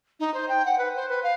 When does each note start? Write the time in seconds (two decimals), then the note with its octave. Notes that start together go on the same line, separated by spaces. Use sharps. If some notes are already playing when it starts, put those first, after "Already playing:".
0.20 D#4
0.34 C5
0.49 G5
0.65 F#5
0.78 B4
0.95 C5
1.09 B4
1.23 F5